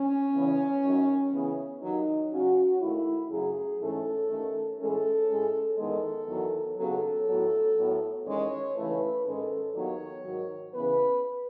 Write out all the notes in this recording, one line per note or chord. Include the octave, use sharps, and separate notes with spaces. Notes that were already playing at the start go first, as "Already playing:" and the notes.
Already playing: C#4
E2 C#3 E3 B3
F#2 D#3 F#3
C#3 E3 B3
D#2 D#3 F#3 D#4
C#3 F#3 C#4 F#4
D#2 D#3 A3 E4
F#2 C#3 F#3 A3 G#4
G#2 E3 A3 C#4 A4
D#2 D#3 A3 C#4
A2 E3 G#3 C#4 A4
A2 G#3 C#4
E2 D#3 G#3 B3 A4
E2 D#3 F#3 B3
D#2 C#3 F#3 B3 A4
A2 F#3 B3
A2 F#3 B3
E2 D#3 G#3 C#4 C#5
D#2 C#3 E3 A3 B4
G#2 D#3 G#3 C#4 A4
D#2 D#3 F#3 B3 C#5
G#2 D#3 F#3
C#3 E3 B3 B4